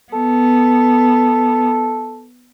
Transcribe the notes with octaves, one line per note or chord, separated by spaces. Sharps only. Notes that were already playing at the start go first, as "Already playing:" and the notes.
B3 A4